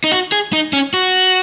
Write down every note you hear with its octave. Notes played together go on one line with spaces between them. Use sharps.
D#4
F#4
G#4
D#4
C#4
F#4